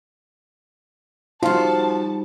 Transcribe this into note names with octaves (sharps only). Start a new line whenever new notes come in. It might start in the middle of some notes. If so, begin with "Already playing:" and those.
F3 G3 C4 D#4 F4 F#4 A5